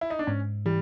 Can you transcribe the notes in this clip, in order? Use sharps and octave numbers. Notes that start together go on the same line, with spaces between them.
E4
D#4
D4
G#2 C#4
E3 G3